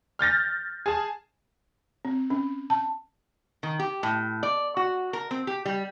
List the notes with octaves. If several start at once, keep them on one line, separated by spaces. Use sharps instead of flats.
F6 G6 A6 A#6
G#4 A5
C4
C#4
A5
D#3
G4
A2
D5
F#4
A#4
C4
G4
G3